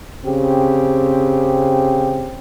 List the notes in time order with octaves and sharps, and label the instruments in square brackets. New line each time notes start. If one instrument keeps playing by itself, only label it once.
[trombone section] C#3 C4 G4